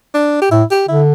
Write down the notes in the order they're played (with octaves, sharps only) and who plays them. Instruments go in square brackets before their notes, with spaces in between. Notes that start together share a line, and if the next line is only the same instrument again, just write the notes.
[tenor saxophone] D4
G4
[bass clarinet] A2 [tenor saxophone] E4
[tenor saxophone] G4
[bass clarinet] D3 [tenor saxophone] E4